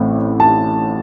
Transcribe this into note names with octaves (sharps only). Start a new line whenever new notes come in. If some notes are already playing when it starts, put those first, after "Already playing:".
Already playing: A1 A2 A3 C4
A5